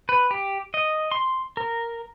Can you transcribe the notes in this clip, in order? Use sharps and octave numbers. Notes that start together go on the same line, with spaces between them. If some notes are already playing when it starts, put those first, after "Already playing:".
B4
G4
D#5
C6
A#4